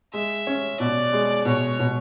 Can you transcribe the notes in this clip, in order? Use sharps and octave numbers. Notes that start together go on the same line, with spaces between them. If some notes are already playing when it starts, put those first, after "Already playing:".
G#3 E5
C#4
B2 D5
G#3
B2 C#5
B2